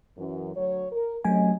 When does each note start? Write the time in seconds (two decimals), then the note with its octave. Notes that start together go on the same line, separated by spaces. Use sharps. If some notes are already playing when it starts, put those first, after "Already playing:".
0.16 F#2 E3
0.55 D2 F#3 C#5
0.92 A#4
1.24 C3 F#3 A3 C#4 D#5 G#5